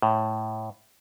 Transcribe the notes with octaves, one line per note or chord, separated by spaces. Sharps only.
A2